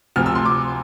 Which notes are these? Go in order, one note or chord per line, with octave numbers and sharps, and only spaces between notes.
D2 C3 F3 F6
E6
C6
D6